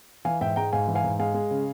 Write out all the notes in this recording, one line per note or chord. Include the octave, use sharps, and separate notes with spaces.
E3 F5 G#5
G#2 E5 G5
G#3 G5 A#5
G#2 F5 G#5
E3
F5 G#5
G#2
G#3 F5 G#5
G#3
C#3